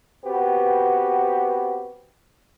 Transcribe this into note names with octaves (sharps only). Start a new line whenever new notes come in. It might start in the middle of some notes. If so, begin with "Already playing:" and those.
B3 C4 F#4 G4 B4